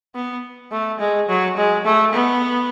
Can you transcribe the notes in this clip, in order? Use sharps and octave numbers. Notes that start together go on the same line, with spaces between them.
B3
A3
G#3
F#3
G#3
A3
B3